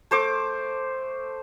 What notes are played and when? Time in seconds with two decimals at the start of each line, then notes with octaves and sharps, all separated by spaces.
0.11 A3 C5 D6